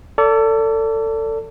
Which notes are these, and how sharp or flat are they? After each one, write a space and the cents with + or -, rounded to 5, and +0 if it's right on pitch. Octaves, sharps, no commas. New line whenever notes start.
A4 +25 D5 -30